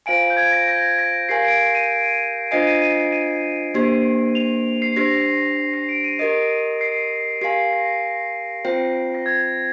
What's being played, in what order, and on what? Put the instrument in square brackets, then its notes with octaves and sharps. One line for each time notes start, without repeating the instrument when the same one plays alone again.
[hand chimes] F4 C5 F5 G#5 [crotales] D7
[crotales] G6
G#6
A#6
A#6
A#6
[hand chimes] G4 A#4 F5 G#5 [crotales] C7
[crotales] D7
D7
D#7
[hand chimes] D4 F4 C5 D#5 G#5 [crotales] C7
[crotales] D#7
D#7
D#7
D#7
[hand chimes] A#3 D4 G4 C5
[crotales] F7
C7
[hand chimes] D4 G4 C5 [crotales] A#6
[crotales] C7
D7
D#7
[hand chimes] G4 A#4 D#5 [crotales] D#7
[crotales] C7
[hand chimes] G4 A#4 F5 G#5 [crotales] C7
[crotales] A#6
[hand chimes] C4 F4 C5 G5
[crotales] A#6
G#6